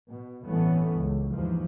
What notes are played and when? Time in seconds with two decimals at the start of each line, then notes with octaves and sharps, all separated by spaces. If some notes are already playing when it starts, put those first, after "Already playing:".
0.11 B2
0.46 A1 G2 E3 A3 B3 C#4
0.94 C#2
1.32 D#2 G#2 E3 F3